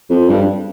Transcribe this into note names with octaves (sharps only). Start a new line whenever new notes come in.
F2
G2